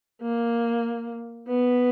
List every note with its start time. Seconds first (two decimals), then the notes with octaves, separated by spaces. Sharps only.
0.22 A#3
1.48 B3